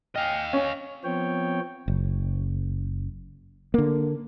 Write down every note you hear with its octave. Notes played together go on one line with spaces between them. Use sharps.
D#5 F5 G5 G#5 F6
C#4 G#5 C#6
F3 B3 C4 C#5 G5
F#1
D3 A#3